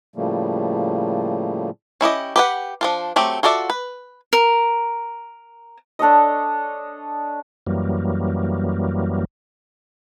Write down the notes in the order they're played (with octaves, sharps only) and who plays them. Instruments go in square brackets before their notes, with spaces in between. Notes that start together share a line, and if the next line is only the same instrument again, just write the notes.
[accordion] A2 C#3 F3 G3 A3 A#3
[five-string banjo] C#4 E4 G4 D#5
G4 B4 F#5
F3 D4 F4
F#3 A3 C4 G4
F4 F#4 A4 D5 E5
B4
[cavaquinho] A#4
[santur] D4 A4 C#5 D#5
[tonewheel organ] F#2 E3 F#3 G3 A#3